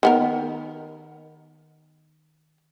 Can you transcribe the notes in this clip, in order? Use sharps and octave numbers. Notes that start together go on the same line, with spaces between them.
D#3 B3 A#4